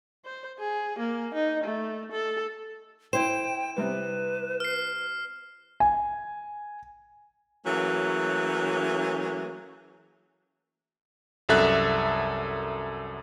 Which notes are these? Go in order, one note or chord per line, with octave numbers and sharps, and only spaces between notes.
C5
G#4
A#3
D#4
A3
A4
E4 C5 G5 E7
C3 G3 B3 B4
F6 C7
G#5
E3 F#3 A3 A#3 C#4 G#4
C2 F#2 A4 E5 F#6